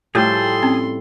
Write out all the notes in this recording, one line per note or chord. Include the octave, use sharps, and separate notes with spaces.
A2 F3 G3 G#4 A4 G5 A5 C6
C4 C#4